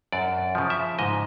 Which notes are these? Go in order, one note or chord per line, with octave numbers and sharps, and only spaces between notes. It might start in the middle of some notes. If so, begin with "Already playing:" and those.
F#2 D5
C#3 F3
E5
G#2 D#5